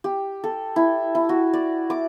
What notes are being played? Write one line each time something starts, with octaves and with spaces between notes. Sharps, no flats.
G4
A4
E4
E4
F#4
D5
D6